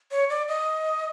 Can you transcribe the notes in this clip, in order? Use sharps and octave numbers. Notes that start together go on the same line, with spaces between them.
C#5
D5
D#5